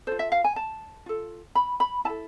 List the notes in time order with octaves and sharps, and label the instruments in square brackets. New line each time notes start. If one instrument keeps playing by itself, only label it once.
[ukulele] F4 A4 C5
E5
F5
G#5
A5
F4 A4
B5
B5
E4 A5
A4